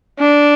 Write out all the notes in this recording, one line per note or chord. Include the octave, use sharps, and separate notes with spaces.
D4